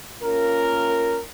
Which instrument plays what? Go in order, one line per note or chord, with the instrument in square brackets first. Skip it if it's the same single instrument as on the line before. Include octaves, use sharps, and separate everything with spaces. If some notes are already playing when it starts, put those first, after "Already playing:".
[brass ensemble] A#3 C#4 F4 A#4